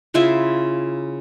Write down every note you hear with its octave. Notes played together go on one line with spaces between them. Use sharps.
C#3 E4 F4 E5